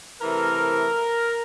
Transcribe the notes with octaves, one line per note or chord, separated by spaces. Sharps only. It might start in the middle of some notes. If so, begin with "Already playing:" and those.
C3 E3 A3 A#4